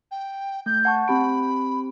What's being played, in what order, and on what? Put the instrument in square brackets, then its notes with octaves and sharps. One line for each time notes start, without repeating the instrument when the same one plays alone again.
[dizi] G5
[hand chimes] A3 [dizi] G6
[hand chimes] F#5 A5 C#6
[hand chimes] C4 G4 D7 [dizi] B5